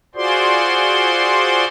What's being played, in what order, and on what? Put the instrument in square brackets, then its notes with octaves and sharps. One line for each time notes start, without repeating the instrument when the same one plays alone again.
[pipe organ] F4 F#4 G#4 C5 D5 C6